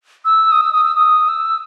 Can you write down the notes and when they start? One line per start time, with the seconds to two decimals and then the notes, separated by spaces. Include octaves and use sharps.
0.25 E6
0.52 D#6
0.61 E6
0.73 D#6
0.85 E6
0.95 D#6
1.29 E6